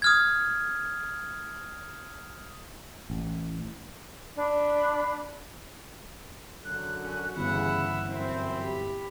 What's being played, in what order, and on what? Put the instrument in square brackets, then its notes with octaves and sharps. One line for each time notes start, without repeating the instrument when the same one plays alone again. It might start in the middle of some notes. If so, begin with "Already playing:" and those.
[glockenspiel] D#6 F6 G#6
[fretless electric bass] A1
[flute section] D4 B5
[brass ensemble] F#2 D3 F#3 [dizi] F#6
[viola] C#4 F#4
[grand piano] G1 E3 [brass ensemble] C#3 [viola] E5 F#5 [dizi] B5
[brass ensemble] F#2 C4 [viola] E4 [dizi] E5
[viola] G4 B5